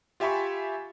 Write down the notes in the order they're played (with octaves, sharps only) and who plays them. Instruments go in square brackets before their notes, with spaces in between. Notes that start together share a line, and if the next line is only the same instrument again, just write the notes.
[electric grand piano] F4 G4 E5 G#5 B5 C#6